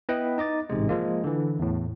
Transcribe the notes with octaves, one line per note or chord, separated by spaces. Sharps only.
B3 E4 B4 D#5 F#5 G5
D#4 D#5 D6 A6
A1 G#2 C3 G#3
F3 G#3 A#3
D3 E3
E2 A2